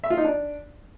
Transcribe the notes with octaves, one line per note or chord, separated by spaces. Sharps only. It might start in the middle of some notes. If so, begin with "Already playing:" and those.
E5
F4
D#4
D4